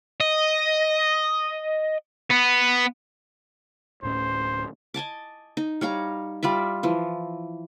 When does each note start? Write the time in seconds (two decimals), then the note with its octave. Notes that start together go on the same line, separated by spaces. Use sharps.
0.21 D#5
2.30 B3
4.03 D1 A2 C#4 C5
4.94 D#5 G#5 A5 D6
5.57 D#4
5.81 G3 C#5 F5 A#5
6.43 G3 F4 D5 E5
6.83 E3 F3